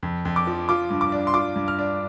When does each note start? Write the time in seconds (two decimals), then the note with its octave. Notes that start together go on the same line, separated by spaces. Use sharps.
0.03 F2
0.25 F2
0.36 D6
0.47 F3
0.69 F4 D6
0.90 G2
1.01 D6
1.12 D4
1.27 C6
1.34 F4 D6
1.56 G2
1.68 F6
1.79 D4